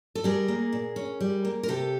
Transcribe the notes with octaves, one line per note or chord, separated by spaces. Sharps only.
A4
G3 G#4 A#4
A#3
A#2
C#4
G3
A#3
A#4
C3 G4 A4